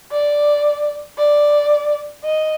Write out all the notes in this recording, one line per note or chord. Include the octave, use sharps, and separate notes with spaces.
D5
D5
D#5